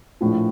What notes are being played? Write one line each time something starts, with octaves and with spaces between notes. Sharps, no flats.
A#1 A2 F3